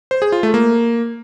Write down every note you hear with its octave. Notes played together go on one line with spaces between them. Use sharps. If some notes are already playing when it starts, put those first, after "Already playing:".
C5
G#4
F4
A3
A#3